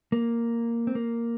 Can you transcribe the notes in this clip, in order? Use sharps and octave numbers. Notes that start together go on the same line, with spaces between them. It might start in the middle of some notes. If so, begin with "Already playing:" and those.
A#3
C4
A#3